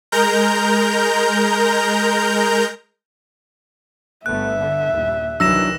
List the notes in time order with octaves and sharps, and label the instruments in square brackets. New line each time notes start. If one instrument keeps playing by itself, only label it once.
[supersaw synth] G#3 A#4 A#5 G6
[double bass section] G1 A3 B3 [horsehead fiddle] E5 [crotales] F#6
[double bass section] D3
A#1 D#2 G3
[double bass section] C2 D#3 E3 [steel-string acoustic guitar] F#3 D4 [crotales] E6 A#6 E7